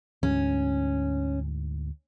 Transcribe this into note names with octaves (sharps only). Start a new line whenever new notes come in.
D2 G#2 C#4